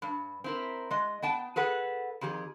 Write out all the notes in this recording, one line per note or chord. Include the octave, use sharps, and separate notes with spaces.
G2
C4 E4 A#4
G#3 D#5
B3 G5 A5
G#4 A4 B4 F#5
F2 D#3 G4 G#4